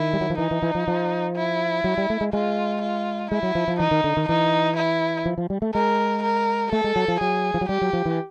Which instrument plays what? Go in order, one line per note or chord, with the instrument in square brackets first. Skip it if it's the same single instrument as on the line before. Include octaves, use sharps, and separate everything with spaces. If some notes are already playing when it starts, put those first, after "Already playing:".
Already playing: [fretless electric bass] D#3 [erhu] E4
[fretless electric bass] G3
F#3
F3
[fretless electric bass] E3 [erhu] D#4
[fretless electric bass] E3
E3
F3
F3
[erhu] E4
[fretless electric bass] F#3
G3
A3
G#3
[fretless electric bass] G#3 [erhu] F4
[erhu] F4
[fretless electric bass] G#3 [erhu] E4
[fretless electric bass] F#3
F3
F3
[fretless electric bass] E3 [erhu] D#4
[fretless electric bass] D#3
D3
D#3
[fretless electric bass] E3 [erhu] D#4
[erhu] E4
[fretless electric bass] F3
F3
G3
A3
[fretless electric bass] G#3 [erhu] A#4
[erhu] A#4
[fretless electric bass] A3 [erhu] A4
[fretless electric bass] G#3
F#3
F3
[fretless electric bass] F#3 [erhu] G#4
[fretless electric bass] F3
F#3
[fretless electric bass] G3 [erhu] G4
[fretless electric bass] F#3
F3
E3